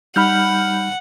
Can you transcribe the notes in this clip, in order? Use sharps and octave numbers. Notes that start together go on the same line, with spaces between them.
G3 D#4 F#5 B5 F6 G6